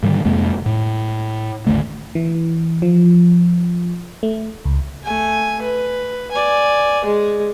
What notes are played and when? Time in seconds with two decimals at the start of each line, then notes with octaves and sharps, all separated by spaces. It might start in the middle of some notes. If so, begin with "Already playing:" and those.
0.03 G#2 D3 D#3 G3
0.25 F2 C3 G#3 A#3
0.66 A2
1.67 G#1 D#2 D3 A3
2.15 E3
2.82 F3
4.23 A3
4.65 C#2
5.04 A3 G#5
5.62 B4
6.31 D5 G#5
7.05 G#3 G#4